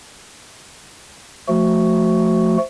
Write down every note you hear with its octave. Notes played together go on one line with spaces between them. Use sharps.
F3 A3 F#4